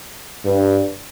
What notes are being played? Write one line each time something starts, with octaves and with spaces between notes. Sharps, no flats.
G2